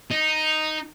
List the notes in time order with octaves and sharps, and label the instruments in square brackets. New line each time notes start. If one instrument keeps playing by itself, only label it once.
[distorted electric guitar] D#4